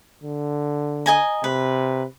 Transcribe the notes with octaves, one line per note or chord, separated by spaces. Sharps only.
D3
D#5 G#5 A#5
C3 B4